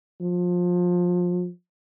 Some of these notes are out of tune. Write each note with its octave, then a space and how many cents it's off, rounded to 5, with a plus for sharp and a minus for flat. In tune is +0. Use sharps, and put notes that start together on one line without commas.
F3 +25